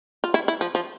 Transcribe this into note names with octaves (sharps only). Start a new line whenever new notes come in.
F4
E4
E4
F3
F3